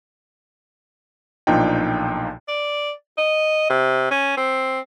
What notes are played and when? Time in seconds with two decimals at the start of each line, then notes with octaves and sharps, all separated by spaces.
1.47 B1 A#2 F3 D4 D#4 G5
2.48 D5
3.18 D#5
3.70 C3
4.11 C#4
4.37 C4